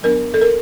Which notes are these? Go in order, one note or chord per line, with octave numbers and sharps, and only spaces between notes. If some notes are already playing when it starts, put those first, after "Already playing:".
F#3 B3 D4 A#4
A4
A#4